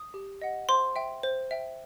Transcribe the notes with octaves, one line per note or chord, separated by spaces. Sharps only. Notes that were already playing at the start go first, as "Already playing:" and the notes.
Already playing: D#6
G4
D#5 F#5
C5 C6
E5 G5
C5
E5 G5